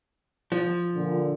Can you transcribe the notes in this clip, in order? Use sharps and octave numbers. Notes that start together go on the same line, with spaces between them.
F3
A#2 D3